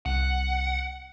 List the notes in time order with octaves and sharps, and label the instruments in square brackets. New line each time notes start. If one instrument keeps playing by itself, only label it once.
[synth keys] C2 F#6 [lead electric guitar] F#5